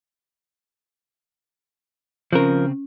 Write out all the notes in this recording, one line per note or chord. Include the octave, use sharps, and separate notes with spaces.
C#3 F3 C4 C#4 A#4 F#6